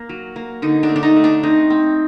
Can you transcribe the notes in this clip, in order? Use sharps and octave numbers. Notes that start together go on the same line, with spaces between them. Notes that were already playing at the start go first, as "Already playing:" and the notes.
Already playing: A#3
F#3
A#3
D3 D#4
D4
A3
D4
D#4
A3
D4
C4 D#4
C4